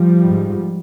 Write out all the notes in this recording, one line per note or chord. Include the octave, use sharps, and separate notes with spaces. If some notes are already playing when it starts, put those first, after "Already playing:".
Already playing: F3 G3
G#2